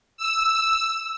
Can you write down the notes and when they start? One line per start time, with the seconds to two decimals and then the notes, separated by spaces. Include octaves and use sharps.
0.17 E6